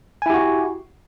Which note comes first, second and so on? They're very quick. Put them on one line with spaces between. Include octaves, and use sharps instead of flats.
G#5 E4 G4 F#4